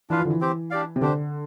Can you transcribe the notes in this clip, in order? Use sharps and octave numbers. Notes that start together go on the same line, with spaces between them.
E3 D4 F4 B4 F5
F3
D3
E3
C4 G4 C5
D4 G4 D5 F5
C3
D3 D4 G4 C5